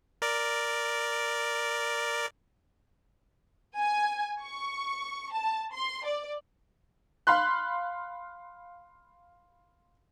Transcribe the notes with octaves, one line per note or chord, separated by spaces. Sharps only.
A#4 D5
G#5
C#6
A5
C6
D5
F5 B5 C6 F#6